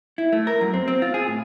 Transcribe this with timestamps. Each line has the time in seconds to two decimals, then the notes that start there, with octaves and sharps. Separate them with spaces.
0.18 E4
0.32 A3
0.47 A#4
0.61 F#2
0.74 C4
0.88 C4
1.02 F4
1.14 G#4
1.28 A2